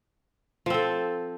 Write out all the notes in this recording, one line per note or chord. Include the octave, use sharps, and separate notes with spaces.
F3 C4 A4